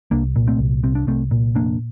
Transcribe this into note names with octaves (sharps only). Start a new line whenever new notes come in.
C2 A#3 D4
A#2
A3 C4
C2
C2 C4
D4
C2 A3 C4
A#2
F1 A#3 D4